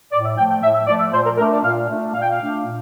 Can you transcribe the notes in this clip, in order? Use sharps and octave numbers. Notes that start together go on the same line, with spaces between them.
A2 D5
E5
F3 A3 G5
G5
A2 E5
E5
F3 A3 D5
E5
A#2 C5
A#4
A3 D4 A#4
D5
A#2 F5
A3 D4
A#2 F5
G5
F5
A3 D4
A#2